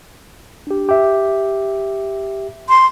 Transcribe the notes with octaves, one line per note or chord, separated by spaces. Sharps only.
D4 G4
G4 E5
C6